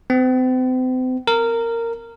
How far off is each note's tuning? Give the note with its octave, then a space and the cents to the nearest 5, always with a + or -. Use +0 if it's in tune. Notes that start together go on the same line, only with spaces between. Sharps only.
C4 -40
A#4 -15